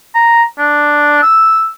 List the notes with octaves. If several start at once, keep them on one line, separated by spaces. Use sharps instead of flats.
A#5
D4
E6